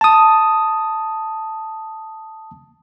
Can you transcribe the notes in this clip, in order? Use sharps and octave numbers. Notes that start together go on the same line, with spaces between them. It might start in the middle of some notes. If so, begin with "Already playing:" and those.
A5 D#6